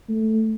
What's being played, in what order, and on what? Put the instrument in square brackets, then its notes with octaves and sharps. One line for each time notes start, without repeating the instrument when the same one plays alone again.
[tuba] A3